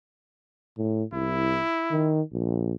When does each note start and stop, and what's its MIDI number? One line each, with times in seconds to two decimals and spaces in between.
0.78 1.04 45
1.13 1.60 36
1.13 2.18 64
1.91 2.22 51
2.33 2.74 34